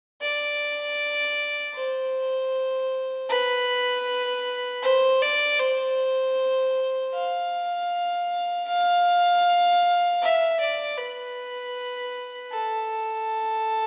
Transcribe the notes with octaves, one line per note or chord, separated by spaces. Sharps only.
D5
C5
B4
C5
D5
C5
F5
F5
E5
D5
B4
A4